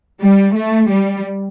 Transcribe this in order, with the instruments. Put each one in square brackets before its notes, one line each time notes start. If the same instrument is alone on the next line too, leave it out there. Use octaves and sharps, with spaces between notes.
[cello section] G3
A3
G3